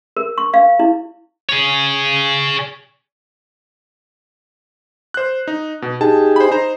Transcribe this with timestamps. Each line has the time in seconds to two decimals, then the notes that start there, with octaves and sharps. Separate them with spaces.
0.17 A#4
0.38 C#6
0.54 F5
0.79 E4
1.49 G#4 C#5
5.14 C5 F#6
5.47 D#4
5.82 B2
6.01 D#4 G4 G#4 A5
6.36 C5 B5
6.51 D#4 C5 A#5